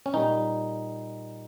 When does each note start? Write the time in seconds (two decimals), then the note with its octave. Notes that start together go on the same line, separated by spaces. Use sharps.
0.06 C#4
0.14 A#2 G3 D#4